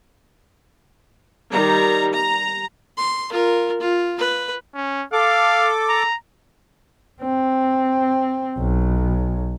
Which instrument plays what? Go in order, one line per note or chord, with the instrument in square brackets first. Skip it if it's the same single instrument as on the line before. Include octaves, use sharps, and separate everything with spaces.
[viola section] D#3 G3 A#5
A#5
[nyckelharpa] C6
F4 A#4
F4
B4
[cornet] C#4
[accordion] A4 D6 [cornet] F5
[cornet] A#5
[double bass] C4
B1